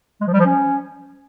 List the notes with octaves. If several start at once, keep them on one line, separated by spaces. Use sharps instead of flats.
G#3
F3
G3
F3
C#4